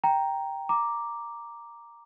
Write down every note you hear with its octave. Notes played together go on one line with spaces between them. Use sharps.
G5 A#5
A#5 D6